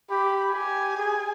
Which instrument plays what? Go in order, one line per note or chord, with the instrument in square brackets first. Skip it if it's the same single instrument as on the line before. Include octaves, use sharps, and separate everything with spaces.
[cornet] G4 [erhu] B5
[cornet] G4 [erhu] G#5
[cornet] G#4